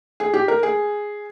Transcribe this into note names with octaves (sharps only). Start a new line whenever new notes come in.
G#4
G4
A#4
G#4